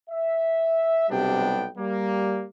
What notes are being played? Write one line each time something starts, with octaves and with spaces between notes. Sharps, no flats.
E5
B1 C3 G3 B3 D4 G5
G3 A#3